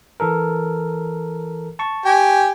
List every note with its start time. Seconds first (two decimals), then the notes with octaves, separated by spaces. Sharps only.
0.20 E3 A4 A#4
1.79 A5 C#6
2.05 G4 G#5